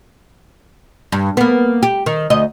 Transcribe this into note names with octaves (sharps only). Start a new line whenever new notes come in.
G2
A#3 B3
G4
D#3
D2 D#5